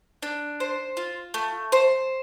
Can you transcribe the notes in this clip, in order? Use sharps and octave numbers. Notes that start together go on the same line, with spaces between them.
D4
C5
F4
A3
C5